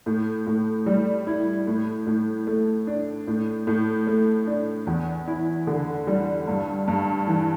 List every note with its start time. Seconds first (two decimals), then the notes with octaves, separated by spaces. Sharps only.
0.06 A2
0.47 A2
0.86 G3
1.27 E4
1.67 A2
2.07 A2
2.47 A3
2.87 D4
3.27 A2
3.67 A2
4.07 A3
4.47 D4
4.87 E2
5.28 E4
5.67 D3
6.07 G3
6.47 G2
6.88 G2
7.27 E3